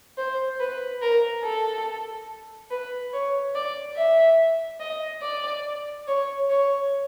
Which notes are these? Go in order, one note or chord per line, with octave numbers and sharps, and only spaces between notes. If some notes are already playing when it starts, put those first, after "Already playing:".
C5
B4
A#4
A4
B4
C#5
D5
E5
D#5
D5
C#5
C#5